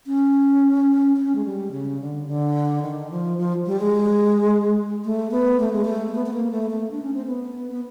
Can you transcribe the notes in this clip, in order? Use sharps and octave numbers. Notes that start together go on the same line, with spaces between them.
C#4
C#4
G#3
G3
C#3
D3
D3
D#3
F3
F3
G3
G#3
A3
B3
A3
G#3
A3
B3
B3
A#3
A3
A3
D4
C#4
C4
B3
B3